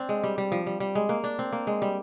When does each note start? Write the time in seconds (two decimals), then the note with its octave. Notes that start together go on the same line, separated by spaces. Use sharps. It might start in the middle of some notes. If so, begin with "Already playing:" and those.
Already playing: C4 D4
0.09 G#3
0.24 G3
0.38 G3
0.52 F3
0.67 G3
0.80 G3
0.95 G#3
1.09 A#3
1.24 D4
1.39 C4
1.52 A#3
1.67 G#3
1.82 G3